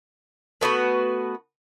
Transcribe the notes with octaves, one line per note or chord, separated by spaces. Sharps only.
A3 B3 F#4 B4